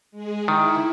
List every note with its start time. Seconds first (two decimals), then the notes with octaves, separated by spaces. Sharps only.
0.11 G#3 G#4
0.48 D#3 E4